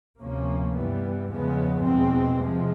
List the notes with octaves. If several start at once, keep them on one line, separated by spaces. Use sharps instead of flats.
D2 C3 F3 A#3 C#4
G2 E3 G3 B3
E2 C#3 F3 G#3 B3
E2 B2 G#3 C4
C3 F3 G#3